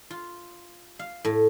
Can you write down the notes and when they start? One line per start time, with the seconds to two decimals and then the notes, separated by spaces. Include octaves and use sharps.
0.11 F4
0.99 F5
1.25 A2